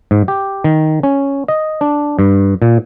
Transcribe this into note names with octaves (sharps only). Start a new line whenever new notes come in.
G#2
G4
D#3
C#4
D#5
D4
G2
A#2